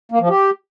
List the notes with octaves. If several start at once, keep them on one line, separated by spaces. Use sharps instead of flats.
A#3
F3
G4